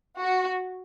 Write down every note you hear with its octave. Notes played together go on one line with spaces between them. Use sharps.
F#4